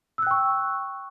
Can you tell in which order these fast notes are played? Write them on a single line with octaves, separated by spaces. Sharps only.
E6 F#6 G5 C#6